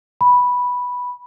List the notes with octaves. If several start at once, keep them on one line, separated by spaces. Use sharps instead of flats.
B5